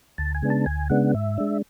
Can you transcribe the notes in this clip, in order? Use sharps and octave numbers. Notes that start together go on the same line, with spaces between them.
D2 A5
G#5
C#3 G#3 B3 D4
A5
D2 G#5
C#3 G#3 B3 D4 F#5
G#2 E5
G#3 D4